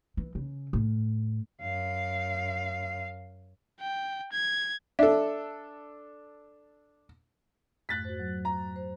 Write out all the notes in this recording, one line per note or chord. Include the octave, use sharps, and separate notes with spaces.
E3
C#3
A2
F#2 F5
G5
G#6
D4 A4 E5
F2 G#2 A3 F#6 A6 B6
F#4 C5
F#3
A#5
C5